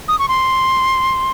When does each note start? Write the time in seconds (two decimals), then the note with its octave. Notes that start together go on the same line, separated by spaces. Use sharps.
0.08 D#6
0.19 C#6
0.28 C6